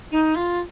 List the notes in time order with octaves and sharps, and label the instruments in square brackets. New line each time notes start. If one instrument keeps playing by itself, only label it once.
[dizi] D#4
F4